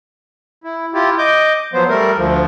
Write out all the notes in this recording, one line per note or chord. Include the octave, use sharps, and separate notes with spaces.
E4
E4 F4 G4
D#5 D6 G6
F3 F#3 B3 C5
G3 A3 A#4
D2 F3